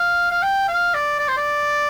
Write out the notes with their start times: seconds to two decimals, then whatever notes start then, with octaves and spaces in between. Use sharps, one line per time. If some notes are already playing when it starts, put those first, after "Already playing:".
Already playing: F5
0.32 F5
0.43 G5
0.68 F5
0.94 D5
1.19 D5
1.28 C5
1.37 D5